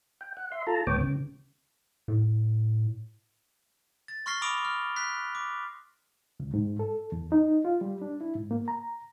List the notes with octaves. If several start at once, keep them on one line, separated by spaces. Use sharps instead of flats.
G5
F#5
E5 C6
F4 A4 A5 A#5
D2 G#2 B3 C#5 G5 D6
C#3
A2
A6
C6 C#6 F6 A#6 C7 G7
B5 C6 D6 D#6 D7 F7
F6
F#6 B6
D6
C#2
G#2
A4
E2
D#4
F4
G3
D4
E4
G#2
A#3
A#5